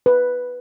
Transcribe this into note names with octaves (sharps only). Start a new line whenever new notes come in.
B4